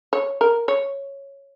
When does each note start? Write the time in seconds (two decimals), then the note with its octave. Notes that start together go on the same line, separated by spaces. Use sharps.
0.13 C#5
0.41 A#4
0.68 C#5